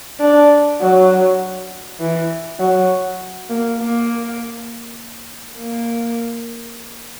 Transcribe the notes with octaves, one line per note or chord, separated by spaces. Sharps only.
D4
F#3
E3
F#3
A#3
A#3
A#3